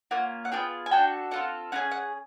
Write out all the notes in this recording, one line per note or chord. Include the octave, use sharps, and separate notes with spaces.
A#3 C#4 F4 F#5
F#5
B3 D4 F4 G#4 G5
G#5
D4 F#4 A4 G5
C4 F4 A4 F#5
C#4 F4 G#4 F#5
F#5